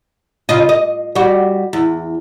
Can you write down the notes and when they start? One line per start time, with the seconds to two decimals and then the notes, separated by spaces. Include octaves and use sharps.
0.49 C#3 F4 D#5
0.69 D#5
1.15 G3 F#4
1.73 E2